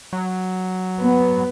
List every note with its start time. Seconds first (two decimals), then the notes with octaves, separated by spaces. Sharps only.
0.13 F#3
0.99 B3